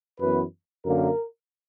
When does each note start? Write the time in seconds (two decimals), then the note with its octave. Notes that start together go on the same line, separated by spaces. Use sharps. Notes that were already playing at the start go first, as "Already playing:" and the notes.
0.20 F#2 E3 B3 B4
0.85 F#2 D3 A#3 A#4